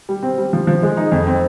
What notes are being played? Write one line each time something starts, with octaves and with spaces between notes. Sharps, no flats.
G3
C4
G3
F3
F3
G#3
D#4
F2
C4